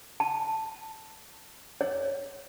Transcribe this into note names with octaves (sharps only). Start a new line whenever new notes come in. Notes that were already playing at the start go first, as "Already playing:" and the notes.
A5
C#5